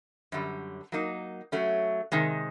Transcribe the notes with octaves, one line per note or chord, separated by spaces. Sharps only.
F#2 D3 G3
F#3 A#3 D#4
F#3 A3 C#4
C3 D#3 G#3